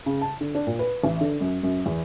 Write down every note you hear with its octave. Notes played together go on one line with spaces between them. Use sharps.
C#3
A5
D3
D4
A#2
B4
A1
D3
F#2
F#2
E2